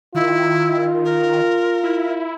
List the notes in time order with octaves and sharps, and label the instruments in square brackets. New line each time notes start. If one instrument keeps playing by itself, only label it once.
[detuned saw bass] D#3 [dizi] E4 [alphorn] F4
[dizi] A#4
[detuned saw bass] E4